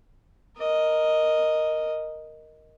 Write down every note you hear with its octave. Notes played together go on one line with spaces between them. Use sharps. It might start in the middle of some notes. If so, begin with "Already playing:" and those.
A#4 D#5